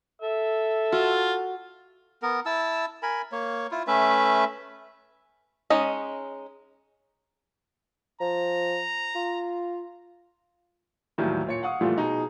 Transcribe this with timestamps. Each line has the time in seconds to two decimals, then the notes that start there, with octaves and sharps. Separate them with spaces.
0.22 A4 E5
0.92 F4 F#4
2.22 B3 A#4
2.46 E4 A5 E6
3.03 A#4 G#5 B5
3.32 A#3 C#5
3.71 E4 F4
3.87 A3 C#4 B4 E5
5.70 G#3 C#4 D#4 D#5
8.21 F3 A#5
9.16 F4
11.18 D#2 A2 D#3 E3 F#3 G3
11.47 A#2 C#5 C#7
11.63 F5 F#5 C#6 D#6
11.81 A#2 E3 F3 G3 A3 F4
11.96 B2 D#4 G#4